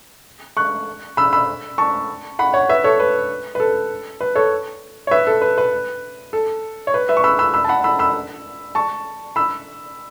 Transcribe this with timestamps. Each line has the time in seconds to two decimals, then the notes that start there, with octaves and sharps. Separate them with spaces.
0.57 C#6 F#6
1.17 B5 E6
1.33 B5 E6
1.78 A5 C#6
2.39 F#5 B5
2.54 C#5 F#5
2.69 B4 E5
2.84 A4 C#5
3.00 B4
3.55 B4
3.60 A4
4.21 B4
4.35 A4 C#5
5.07 C#5
5.11 B4 E5
5.27 A4
5.42 B4
5.58 B4
6.33 A4
6.87 C#5
6.94 B4
7.09 B4 E5
7.17 C#6
7.24 B5 E6
7.39 B5 E6
7.54 B5 E6
7.64 A5
7.69 F#5 B5
7.84 B5 E6
7.99 B5 E6
8.75 A5 C#6
9.36 B5 E6